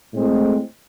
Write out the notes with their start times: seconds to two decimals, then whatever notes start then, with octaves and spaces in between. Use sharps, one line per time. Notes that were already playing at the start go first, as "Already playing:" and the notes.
0.14 A2 G#3 C4